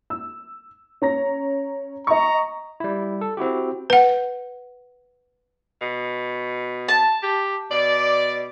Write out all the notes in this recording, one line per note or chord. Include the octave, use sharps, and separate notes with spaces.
E6
C#4 A#5 A#6
D#5 A#5 C#6
G3 E4
A4
C4 E4 F#4 G4
B4 F#5
B2
A5
G4
B2 D5